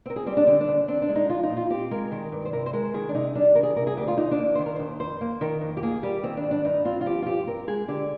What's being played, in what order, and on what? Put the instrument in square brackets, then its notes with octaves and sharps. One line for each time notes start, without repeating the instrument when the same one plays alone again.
[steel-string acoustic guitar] C4 A#4
G#4
G3 C4
D4
D3 C4
D4
D#2
C4 D4
D4
G#3
D#4
F3 F4
D#4
A#2
F4
C4 G4
G#3 A#4
D#3 A#4
G2
C5
C3 A#4
C5
G#3 A#4
D#3 G#4
D4
C3 D#4
G3 D4
D#3 A#4
G#4
C3 A#4
G#4
D2 G4
F4
D#2 D#4
D4
A#3
D#3 C5
A#4
D#2 C5
F2 C5
A#3
D#3 A#4
F2
G4
A#3 G#4
G3 G4
D#3 C4
D4
G#2
D4
G2 D#4
C4 F4
F4
F3 G4
F4
G2 G4
C4 A#4
G#3 G#4
D3 G4